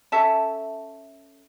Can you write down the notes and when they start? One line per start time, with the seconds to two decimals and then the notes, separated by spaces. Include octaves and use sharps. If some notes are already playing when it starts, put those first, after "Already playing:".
0.12 C#4 A4 E5 A5